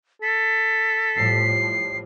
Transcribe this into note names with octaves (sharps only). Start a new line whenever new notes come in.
A4 B6
A2 F3 G3 C7